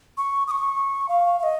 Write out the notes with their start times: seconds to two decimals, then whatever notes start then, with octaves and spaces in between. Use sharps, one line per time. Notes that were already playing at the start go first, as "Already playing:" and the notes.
0.17 C#6
0.47 D#6
0.51 C#6
1.09 F5
1.39 F5
1.43 D#5